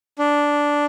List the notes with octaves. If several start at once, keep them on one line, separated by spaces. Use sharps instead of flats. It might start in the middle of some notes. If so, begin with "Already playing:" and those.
D4